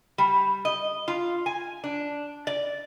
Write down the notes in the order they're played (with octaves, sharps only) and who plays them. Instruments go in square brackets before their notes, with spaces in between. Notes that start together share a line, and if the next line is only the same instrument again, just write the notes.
[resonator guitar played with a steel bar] G3
D#5
F4
G#5
D4
D5